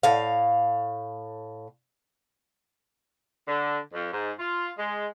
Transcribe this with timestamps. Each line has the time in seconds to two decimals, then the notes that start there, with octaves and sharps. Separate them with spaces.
0.03 A2 F5
3.47 D3
3.93 F2
4.11 G#2
4.38 F4
4.77 G#3